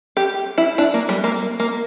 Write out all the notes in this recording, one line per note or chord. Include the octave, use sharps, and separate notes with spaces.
G4
E4
D4
A#3
G3
A#3
A#3